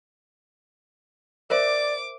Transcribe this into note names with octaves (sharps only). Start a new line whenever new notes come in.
A#4 C5 D5 E5 D6